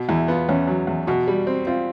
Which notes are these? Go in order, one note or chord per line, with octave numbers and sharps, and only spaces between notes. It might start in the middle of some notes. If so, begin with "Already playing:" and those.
Already playing: B2
E2 E4
B3 F4
E2 C#4
F#3
E2
B2 F#4
G3
C4
C4 F4